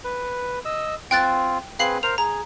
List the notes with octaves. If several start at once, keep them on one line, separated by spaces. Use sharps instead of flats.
B4
D#5 E6
C4 F4 G5 F#6 A6
C4 G#4 B4 F5 C7 F#7
A#4 C5 F7
G#4 A#5